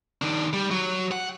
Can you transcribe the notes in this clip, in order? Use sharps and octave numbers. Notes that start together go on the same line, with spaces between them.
D#3 D4
G3
F#3
F#5